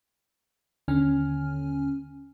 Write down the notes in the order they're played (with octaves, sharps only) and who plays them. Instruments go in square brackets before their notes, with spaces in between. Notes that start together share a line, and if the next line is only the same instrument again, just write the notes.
[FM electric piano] D#2 D3 C#4 G#5 F6